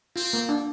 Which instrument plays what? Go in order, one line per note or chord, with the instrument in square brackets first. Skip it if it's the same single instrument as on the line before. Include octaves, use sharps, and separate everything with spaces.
[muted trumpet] C4 [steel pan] F4
[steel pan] A#3
D4